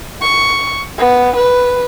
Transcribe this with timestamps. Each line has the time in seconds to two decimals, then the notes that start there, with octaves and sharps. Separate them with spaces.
0.22 C#6
0.99 B3
1.36 B4